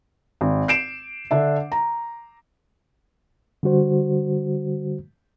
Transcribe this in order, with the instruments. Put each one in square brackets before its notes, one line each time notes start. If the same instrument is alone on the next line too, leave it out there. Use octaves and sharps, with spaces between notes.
[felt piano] G#1
C7 D7 E7
D3 D4 E5
A#5
[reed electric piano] D3 G3 F#4 C5